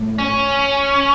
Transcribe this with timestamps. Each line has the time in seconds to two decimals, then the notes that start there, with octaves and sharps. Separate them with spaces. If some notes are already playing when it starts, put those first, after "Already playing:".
Already playing: A2
0.19 C#4